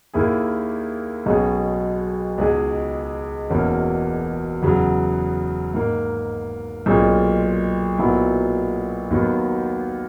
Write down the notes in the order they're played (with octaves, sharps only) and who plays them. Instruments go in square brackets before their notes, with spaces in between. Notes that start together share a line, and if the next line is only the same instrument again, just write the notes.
[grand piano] D#2 D#3 A#3 E4 G#4
B1 B2 G#3 C#4 G#4
C#2 B2 G#3 D#4 G#4
E1 E2 B2 A#3 C#4
E2 C#3 F#3
G#2 D#3 A#3
B1 A#2 G#3 C#4 G#4
B1 A#2 F#3 B3 E4
D#2 D#3 F#3 B3